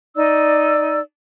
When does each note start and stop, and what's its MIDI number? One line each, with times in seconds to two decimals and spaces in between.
0.16 1.00 63
0.16 1.00 74
0.16 1.00 88